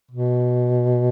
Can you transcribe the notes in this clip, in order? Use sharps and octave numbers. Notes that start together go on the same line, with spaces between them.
B2